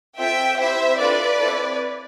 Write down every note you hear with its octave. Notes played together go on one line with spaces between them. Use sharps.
C4 F4 A4 E5 G5
C4 E4 G4 C5 E5
D4 F4 A4 B4 D5
C4 E4 A4